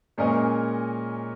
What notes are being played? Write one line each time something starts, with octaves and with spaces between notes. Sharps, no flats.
A#2 G#3 C#4 A#4 D#5